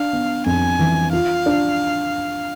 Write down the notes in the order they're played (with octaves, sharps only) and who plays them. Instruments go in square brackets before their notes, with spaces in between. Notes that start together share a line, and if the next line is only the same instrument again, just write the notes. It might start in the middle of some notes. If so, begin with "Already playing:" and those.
Already playing: [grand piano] D4 [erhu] F5
[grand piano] B3
[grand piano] F2 [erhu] G#5
[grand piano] E3
[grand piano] F4 [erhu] F5
[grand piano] D4